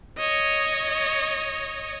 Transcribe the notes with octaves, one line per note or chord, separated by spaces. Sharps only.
C#5 D#5